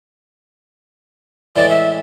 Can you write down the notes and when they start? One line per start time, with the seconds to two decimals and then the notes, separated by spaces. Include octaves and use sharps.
1.56 A2 E3 G#3 D5
1.70 E5